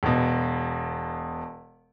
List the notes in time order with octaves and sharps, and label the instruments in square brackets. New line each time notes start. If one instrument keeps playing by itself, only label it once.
[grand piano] E1 B2